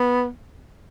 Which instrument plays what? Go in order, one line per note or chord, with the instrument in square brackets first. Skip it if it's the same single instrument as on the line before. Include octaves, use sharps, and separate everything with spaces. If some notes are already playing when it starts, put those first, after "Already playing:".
Already playing: [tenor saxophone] B3